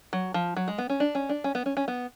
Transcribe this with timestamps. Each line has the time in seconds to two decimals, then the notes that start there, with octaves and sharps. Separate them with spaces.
0.13 F#3
0.34 F3
0.56 F#3
0.68 G#3
0.78 B3
0.90 C#4
1.00 D4
1.15 C#4
1.29 D4
1.44 C#4
1.55 B3
1.66 C#4
1.77 C#4
1.88 B3